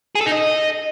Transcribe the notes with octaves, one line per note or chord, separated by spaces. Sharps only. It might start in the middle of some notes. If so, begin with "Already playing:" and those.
G#4
A4
D#4
D#5